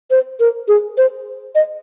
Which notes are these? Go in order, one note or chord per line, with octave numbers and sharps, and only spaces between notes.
C5
A#4
G#4
C5
D#5